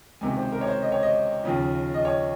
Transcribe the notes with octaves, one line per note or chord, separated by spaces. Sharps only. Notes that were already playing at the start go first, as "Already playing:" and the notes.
C#2 C3 D#3 G#5
C5
A#4
C#5
C5
D#5
C#5
D#5
D#2 C#3 F3
D#5
C#5